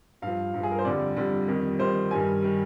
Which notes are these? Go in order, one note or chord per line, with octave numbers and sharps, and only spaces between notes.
G2 F3 F5
G2 F3
G#4
A#4
C5
F2 D3 G3 D5
F2 D3 G3
F2 D#3 G3
F2 D#3 G3 C5
G2 D#3 G3 G#5
D#3 G3